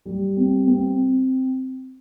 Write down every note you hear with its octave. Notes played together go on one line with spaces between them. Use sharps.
G3
C4
C4